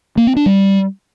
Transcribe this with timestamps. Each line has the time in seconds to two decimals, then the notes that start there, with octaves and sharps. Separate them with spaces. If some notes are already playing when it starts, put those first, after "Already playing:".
0.17 A#3
0.27 C4
0.36 D4
0.46 G3